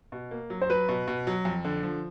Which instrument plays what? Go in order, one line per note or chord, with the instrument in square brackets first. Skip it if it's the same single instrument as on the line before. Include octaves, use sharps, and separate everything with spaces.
[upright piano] B2
A#3
F#3
[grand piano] C5
[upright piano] F#3 [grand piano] B4
[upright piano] B2
B2
F#3
F2
D3
F3